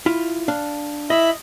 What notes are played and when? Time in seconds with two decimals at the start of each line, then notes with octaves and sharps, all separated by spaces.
0.06 E4 F4
0.48 D4 F5
1.10 E4 D#5 E5 B5